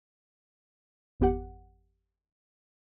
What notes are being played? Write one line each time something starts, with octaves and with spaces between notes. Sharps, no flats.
G#1 F2 B3 G4 F#5